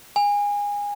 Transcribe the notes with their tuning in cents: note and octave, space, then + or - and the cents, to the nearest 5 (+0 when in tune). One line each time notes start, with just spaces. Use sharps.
G#5 -25